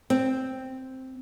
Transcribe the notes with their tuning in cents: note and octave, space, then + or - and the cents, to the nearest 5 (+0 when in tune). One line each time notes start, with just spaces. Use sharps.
C4 +0